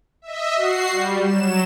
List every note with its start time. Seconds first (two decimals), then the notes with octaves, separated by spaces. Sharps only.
0.22 D#5 E5
0.55 F#4 C7
0.91 G3
1.24 F#3 E7